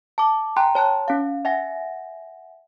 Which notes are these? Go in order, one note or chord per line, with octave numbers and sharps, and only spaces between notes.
A5 D6
G5 G#5 A#5 C6 F#6
C#5 A5 C6 F#6
C#4 F5
E5 F#5 G#5 A#6